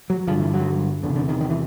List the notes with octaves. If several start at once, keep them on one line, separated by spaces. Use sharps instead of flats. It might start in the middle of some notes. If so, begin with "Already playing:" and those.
F#3
G2 D3 F3
E3
F#3
E2 C3 D3
D3
D#3
D#3
E3